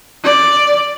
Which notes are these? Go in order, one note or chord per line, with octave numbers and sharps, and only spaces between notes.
D5